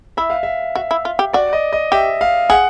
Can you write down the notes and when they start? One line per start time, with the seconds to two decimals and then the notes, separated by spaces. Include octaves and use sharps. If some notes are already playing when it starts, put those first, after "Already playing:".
0.17 E4 E5
0.30 F5
0.43 E5
0.75 F#4 E5
0.91 E4
1.05 F4
1.19 G4
1.33 F#4 D5
1.53 D#5
1.73 D#5
1.92 G4 E5
2.21 F5
2.50 G#4 F#5